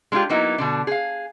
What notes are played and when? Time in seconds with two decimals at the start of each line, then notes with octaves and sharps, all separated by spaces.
0.12 G#3 D4 D#4 F4 G4
0.29 F#3 A#3 B3 D#4 E4
0.58 B2 D3 D4
0.87 G#4 F5